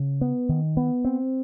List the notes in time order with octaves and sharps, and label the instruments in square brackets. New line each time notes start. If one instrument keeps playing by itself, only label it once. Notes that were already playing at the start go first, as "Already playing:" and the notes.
Already playing: [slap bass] C#3
B3
D#3
B3
C4